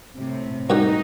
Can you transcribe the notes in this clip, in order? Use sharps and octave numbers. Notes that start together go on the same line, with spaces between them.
A2 C3
C2 D#4 F#4 G4